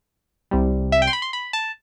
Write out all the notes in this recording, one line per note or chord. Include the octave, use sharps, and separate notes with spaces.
C2 C3 G3
E5
G5
C6
B5
C6
B5
A5